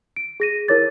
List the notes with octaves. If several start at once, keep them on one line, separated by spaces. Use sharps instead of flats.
D7
G#4 A#6 D#7
E4 A#4 C#5 D6 A6